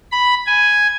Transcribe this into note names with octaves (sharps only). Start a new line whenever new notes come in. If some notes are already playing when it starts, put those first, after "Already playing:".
B5
G#5